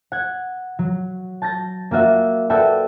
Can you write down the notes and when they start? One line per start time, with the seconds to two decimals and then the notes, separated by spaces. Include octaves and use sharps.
0.12 F#5 G#6
0.79 F#3
1.42 A5 G6 A6 A#6
1.91 A#3 F4 F#4 E5
2.50 F#4 A4 B4 D5 E5 G5